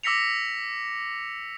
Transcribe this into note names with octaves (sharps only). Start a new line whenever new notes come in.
D6 E6 A#6 B6 C#7 F7